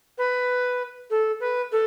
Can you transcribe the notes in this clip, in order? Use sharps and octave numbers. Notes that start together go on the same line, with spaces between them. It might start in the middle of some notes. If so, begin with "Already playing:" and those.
B4
A4
B4
A4